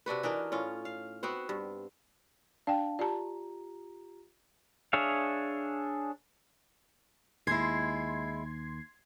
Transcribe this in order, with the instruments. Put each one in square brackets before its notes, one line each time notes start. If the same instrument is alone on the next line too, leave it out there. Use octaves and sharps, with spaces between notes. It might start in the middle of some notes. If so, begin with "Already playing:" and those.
[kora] C3 D4 F#4 B4
E3 D4 D#4 A#4
A2 C#4 F4
F5
B3 C4 F#4 C5
G2
[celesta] D4 F5 A5 [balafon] D5 G5
[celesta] F4 G4 A#5 [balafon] D5 A5
[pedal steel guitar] D4 G#4 C#5 E5 F5
[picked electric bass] D#2 [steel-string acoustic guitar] G#3 E4 [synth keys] C6 G#6 C7